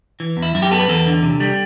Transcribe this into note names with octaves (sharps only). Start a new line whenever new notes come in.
E3
E2
E4
F#2 E4
G4
B3 A4
B4
E2 A4
D3
C3
G3